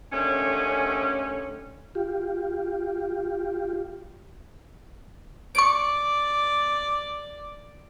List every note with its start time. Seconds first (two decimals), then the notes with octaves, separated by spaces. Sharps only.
0.11 D#2 D3 A3 C#4
1.95 F4 G4
5.55 D5 C#6 D7